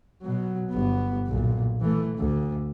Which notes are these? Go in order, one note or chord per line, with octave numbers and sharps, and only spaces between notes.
B2 F#3
G1 B3
B1 A#2
E3 A3
D2